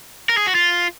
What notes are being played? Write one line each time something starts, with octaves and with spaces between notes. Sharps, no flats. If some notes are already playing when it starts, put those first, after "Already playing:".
A#4
G#4
F#4
F4